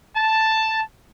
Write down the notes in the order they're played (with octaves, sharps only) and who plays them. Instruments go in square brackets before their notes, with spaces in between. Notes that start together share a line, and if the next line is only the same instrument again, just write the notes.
[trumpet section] A5